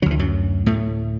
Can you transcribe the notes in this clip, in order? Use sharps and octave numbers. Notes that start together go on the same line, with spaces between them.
D2 D3 E3 F#3
F#2 F#3
A2 A3